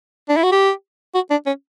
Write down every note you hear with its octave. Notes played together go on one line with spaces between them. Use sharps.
D4
E4
F#4
G4
F#4
D4
C#4